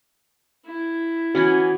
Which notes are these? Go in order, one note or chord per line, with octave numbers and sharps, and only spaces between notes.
E4
E3 B3 C#4 F#4